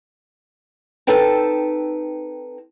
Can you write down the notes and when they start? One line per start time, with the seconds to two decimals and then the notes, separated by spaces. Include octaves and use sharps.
1.07 C4 D#4 A4 B4 G5 A5